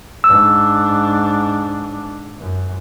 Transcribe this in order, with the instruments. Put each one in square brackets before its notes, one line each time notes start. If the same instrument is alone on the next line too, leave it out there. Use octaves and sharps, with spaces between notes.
[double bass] G#2 D4 [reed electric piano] E6
[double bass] F#2